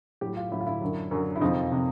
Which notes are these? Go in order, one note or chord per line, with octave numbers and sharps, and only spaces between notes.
A2 F#3 G4
F4
A2 F#3 E4
F4
E4
F#2 D3 F#3
F#2 D3 F#3
E4
F2 C3 F3 D#4
C3 F3